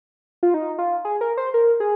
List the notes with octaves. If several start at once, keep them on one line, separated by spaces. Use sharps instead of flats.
F4
D#4
F4
G#4
A#4
C5
A#4
G#4